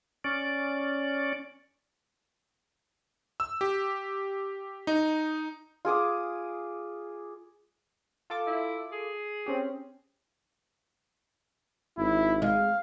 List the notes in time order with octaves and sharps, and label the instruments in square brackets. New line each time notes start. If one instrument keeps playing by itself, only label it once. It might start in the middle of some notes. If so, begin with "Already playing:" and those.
[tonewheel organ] C#4 D5
[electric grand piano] E6
G4
D#4
[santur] F4 G#4 D6 D#6
[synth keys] F4 A4 D6
[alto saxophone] E4
G#4
[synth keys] C4 C#4 G4
[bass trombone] G#1 [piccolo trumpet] E4
[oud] G#3 [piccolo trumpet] F5